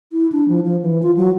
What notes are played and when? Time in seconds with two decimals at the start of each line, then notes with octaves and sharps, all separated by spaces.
0.12 E4
0.32 D4
0.48 F3
0.65 F3
0.82 E3
1.03 F4
1.17 F#3